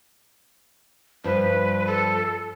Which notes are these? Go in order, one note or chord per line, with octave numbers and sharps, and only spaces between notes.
G2 F3 B4
A4